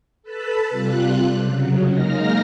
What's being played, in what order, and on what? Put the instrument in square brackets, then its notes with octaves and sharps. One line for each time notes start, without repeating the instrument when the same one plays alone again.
[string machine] A4 B4 A5 B5
C3 G3 F4 F#6
C#3 F#3
G#3 A#3 D#4 F6 A#6